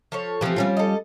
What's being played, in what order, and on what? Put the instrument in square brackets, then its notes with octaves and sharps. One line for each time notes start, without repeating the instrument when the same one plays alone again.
[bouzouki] F3 A4 C#5
[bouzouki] E3 A3 C4 [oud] F3 G4
[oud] G3 C#4 F4
[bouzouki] A4 D#5